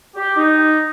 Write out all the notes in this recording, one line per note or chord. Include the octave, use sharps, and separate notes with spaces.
G4
D#4